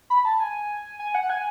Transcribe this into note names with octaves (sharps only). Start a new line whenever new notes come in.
B5
A5
G#5
G#5
F#5
G#5